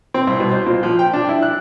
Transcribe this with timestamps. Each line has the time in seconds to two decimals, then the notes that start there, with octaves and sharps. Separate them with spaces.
0.14 C4
0.27 C2
0.40 B2
0.51 C5
0.66 A#2
0.83 F3
0.99 G5
1.13 D4
1.29 E4
1.43 F#6